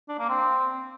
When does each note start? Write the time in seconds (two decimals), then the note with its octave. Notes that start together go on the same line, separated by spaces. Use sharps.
0.08 D4
0.19 A#3
0.29 C4